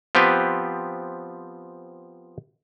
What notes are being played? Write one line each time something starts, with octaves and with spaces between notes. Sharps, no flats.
F3 B3 C4 G4 B4